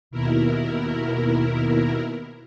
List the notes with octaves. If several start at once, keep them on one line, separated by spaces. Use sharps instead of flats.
D#2 B2 E4 A#4